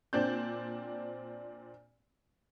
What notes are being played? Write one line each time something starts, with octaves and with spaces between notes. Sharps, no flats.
A#2 C4 D4 G6